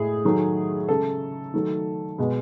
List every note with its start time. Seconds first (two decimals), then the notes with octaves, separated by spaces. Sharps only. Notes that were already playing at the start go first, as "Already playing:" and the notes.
Already playing: A2 G#3 G#4
0.25 D#3 F#3 A3
0.88 C#3 G#3 A4
1.54 D#3 F#3 A3
2.18 B2 G#3